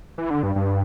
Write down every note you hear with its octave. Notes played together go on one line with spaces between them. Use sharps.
E3
D3
G2
G2